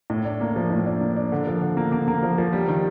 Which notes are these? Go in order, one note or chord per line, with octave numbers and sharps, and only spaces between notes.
A2
D4
A#3
F3
A2
D4
A#3
D4
D3
F3
D3
A#3
A#3
A#3
F3
F3
G3
D#3